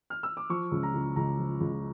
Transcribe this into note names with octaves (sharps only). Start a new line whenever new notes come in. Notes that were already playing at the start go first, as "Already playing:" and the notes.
F6
E6
D6
F3 C#6
C#2
A#5
C#3
C#2 A#5
F3
C#2